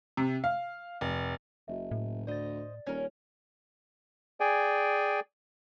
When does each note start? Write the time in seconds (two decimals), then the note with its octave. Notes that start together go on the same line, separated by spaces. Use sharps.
0.17 C3
0.44 F5
1.01 F1
1.68 F#1 F#4 D#5 E5
1.91 A2
2.27 D2 C5 D5 D#5 A6
2.87 D#1 C#4 A#4
4.40 G#4 D5 G5 G#5